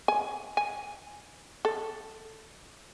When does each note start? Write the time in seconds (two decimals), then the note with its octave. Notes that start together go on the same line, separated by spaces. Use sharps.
0.08 G#5
0.57 G#5
1.65 A4